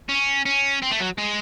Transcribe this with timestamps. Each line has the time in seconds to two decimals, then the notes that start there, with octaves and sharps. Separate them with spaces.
0.09 C#4
0.46 C#4
0.82 C4
0.91 A3
1.00 F#3
1.18 G#3